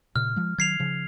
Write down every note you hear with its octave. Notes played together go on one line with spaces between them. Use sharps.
A#2 C#3 F6
F3 G#3
D#3 F#3 G#6 C7 F7
C#3 F3